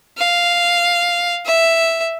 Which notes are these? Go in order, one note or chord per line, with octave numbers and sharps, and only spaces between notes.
F5
E5